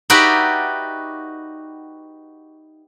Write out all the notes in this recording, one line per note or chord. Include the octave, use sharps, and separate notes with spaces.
D#4 F#4 G4 B4 D5 E5